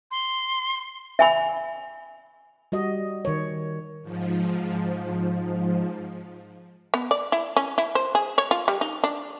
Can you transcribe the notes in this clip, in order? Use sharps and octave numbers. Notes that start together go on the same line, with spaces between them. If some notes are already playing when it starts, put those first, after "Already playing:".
C6
E5 G#5 B5
G3 F#4 D#5
D#3 C#5
G#2 F3
B3
D5
E4
C#4
E4
C5
G#4
C#5
F4
G3
D#4
D4